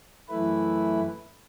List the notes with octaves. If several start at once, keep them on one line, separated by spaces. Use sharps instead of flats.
F#2 E3 A3 E4 B4